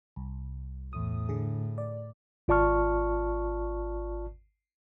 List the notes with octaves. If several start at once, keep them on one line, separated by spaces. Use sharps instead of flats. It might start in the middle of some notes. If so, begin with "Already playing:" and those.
C2
E2 A2 D#6
D3 G#4
D5
G#1 F4 D5 A5 C#6 F6